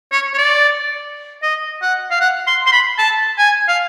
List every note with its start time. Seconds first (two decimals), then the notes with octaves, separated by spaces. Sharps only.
0.12 C#5
0.34 C#5
0.38 D5
1.43 D#5
1.82 F#5
2.11 F5
2.21 F#5
2.47 C6
2.67 C6
2.72 B5
2.98 A5
3.38 G#5
3.69 F5